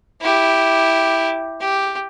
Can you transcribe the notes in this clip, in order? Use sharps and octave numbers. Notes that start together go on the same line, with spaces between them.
E4 G4
G4